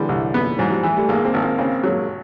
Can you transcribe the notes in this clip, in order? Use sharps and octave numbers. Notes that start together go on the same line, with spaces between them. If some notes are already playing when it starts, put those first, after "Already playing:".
Already playing: D3 E3 G3
C2
B3
G#2 E3 F#3
F3 G3
E3
G3 A3
G#1 G#3 A#3
A#3 C4
G#1
A#3 C4
C#3 A#3 C4
F#3 G#3 A#3